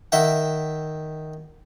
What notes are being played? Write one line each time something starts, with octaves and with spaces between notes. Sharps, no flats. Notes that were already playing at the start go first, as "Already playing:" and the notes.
D#3 E5 F#5 G5